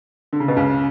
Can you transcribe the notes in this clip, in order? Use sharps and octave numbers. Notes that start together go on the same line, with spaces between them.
D3
C#3
B2
C#2 C#3